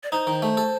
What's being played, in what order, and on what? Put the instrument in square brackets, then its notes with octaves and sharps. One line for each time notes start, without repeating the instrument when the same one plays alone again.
[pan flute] D5
[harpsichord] D#4 [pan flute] C5
[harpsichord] D#3
A3
A4